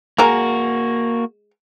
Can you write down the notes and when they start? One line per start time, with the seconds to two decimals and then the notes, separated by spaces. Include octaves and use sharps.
0.18 G#3 A#3 F#4 A#4 G#5